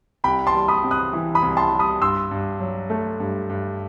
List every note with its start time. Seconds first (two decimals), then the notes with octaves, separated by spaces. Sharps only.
0.24 C2 G5 B5
0.47 A5 C6
0.54 G3
0.68 B5 D#6
0.84 C3
0.91 D#6 F#6
1.13 E3
1.35 B5 D#6
1.42 C2
1.57 A5 C6
1.72 G3
1.79 B5 D#6
2.02 G2 C6 E6
2.31 G2
2.60 F#3
2.90 A3
3.20 G2
3.50 G2